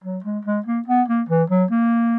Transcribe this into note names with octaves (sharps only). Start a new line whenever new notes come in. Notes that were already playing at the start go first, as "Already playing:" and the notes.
F#3
G#3
G#3
A#3
B3
A#3
E3
F#3
A#3